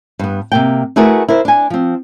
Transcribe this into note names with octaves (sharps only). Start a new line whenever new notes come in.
G2 B3
C3 A#3 G5
A3 E4 F#4 G#4 A#4 B4
E4 A#4 C5
D4 G#5
F3 C4